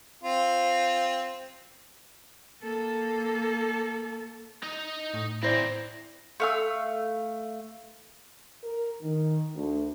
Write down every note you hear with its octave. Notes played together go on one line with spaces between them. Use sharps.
C4 F4
A#3 A4
D#4 D#5
A2
E3 C4 E4 C5 D5 A#5
A3 F5 E6
A#4
D#3
D2